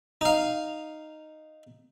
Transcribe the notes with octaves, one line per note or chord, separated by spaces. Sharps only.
D#4 F5